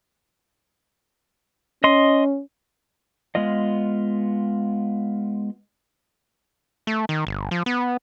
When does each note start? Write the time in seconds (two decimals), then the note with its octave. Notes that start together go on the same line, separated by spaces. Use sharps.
1.84 C#4 D#5 C6
3.35 G#3 B3 F4 D#5
6.87 A3
7.09 D#3
7.27 G1
7.51 F3
7.66 B3